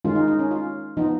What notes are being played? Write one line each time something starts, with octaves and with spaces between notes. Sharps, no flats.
D#3 G#3 C#4 F4
D#4
D#4
C#4
F4
F3 B3 D#4